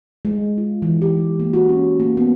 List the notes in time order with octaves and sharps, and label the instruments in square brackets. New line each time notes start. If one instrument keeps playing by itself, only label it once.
[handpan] G#3
F4
E3
G4
G#3
A#3
F#4
C#4
A#3
B3